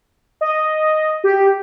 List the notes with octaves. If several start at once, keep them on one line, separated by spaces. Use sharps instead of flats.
D#5
G4